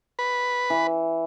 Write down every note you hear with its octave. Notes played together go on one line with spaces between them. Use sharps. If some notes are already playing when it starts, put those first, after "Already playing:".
B4
E3